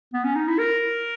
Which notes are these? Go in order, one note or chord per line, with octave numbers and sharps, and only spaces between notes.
B3
C#4
D#4
E4
A#4